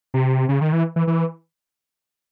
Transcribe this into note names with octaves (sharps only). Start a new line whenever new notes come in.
C3
C#3
D#3
E3
E3
E3